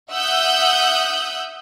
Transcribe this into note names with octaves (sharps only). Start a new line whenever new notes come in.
E5 F#5 D#6 E6 F#6 G6